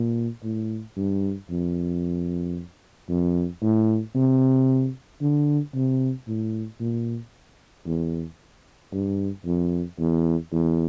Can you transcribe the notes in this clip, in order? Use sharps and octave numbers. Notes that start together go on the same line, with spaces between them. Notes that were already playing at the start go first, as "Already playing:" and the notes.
Already playing: A#2
A2
G2
F2
F2
A2
C3
D3
C3
A2
A#2
E2
G2
F2
E2
E2